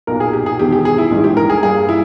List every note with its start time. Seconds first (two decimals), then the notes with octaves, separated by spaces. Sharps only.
0.07 B1 A#2 A#3 A#4
0.20 G#4
0.33 G4
0.46 G#4
0.59 E1 E2 D#3 G4
0.72 G4
0.85 G#4
0.98 E4
1.11 A#1 G#2 E3 G3
1.24 G4
1.37 A#4
1.50 G#4
1.63 G2 G3 A#3 G#4
1.89 E4